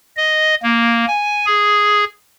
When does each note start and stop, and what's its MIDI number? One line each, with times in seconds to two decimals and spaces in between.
0.17 0.55 75
0.63 1.05 58
1.07 1.45 80
1.46 2.04 68